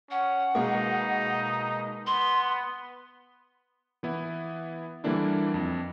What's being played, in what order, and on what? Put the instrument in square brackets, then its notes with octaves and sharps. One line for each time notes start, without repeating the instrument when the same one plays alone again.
[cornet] C#4 [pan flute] F#5
[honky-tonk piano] B2 G#3 A#3 [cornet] D#4
[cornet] B3 [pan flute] C6
[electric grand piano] E3 B3 E4
D3 E3 G3 A#3 D4 E4
F2